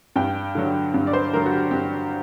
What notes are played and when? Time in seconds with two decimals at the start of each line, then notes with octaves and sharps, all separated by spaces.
0.16 G2 G5
0.55 D3 F#3
0.94 G2
1.07 D5
1.13 C5
1.33 D3 F#3 A#4
1.46 F#4
1.52 G4
1.71 G2 G4